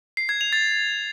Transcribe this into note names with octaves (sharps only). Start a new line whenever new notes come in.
C7
G#6
F7
A6